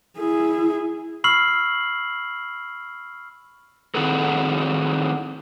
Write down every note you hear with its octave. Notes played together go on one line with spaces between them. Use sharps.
E4 G#4
B5 C#6 E6 F6 C7 F#7
D#3 C4 E4 F#4 G#4 A4